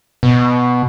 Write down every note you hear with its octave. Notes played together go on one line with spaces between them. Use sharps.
B2